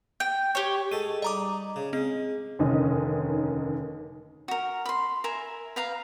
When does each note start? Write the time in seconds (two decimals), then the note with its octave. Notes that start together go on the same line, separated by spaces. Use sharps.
0.20 G5
0.55 G4 C#5
0.91 G#3 A4 D#7
1.22 G3 D#4 D#5 A#5 D6
1.76 C#3
1.93 G#3 C4
2.59 F1 D#2 D3 C#4 D#4 D#5
4.48 F#4 A#4
4.86 B5 C6
5.24 A#4 E5 G#5
5.76 B4 F5 A#5